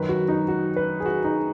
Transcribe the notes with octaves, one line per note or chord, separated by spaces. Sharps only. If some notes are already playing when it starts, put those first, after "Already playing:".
Already playing: F#2 D#3 B4
F#4
D#4
F#4
B4
G#4
F#4
D#4